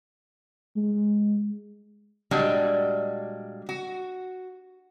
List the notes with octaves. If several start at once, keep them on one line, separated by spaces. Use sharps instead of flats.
G#3
A#2 G3 G#3 D4 F#4
F#4